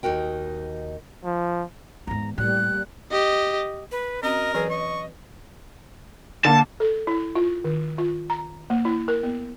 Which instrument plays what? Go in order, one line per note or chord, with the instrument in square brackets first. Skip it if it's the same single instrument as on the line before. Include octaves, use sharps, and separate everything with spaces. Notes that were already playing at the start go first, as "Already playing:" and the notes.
[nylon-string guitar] D#2 D#4 F#4 A#4 G5
[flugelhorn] F3
[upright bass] E2 G#2 [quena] A#5
[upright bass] A2 [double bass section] G3 A#3 [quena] F#6
[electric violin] G4 D#5
[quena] B4
[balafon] C4 C#4 F#4 [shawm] A#4 [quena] D#5
[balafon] E3 F#3 B4 [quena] G#4
[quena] D#5 [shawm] C#6
[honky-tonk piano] D3 A#3 [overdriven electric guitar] A5
[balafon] A4
E4
F4
D#3
F4
A#5
A#3
E4
A#4
B3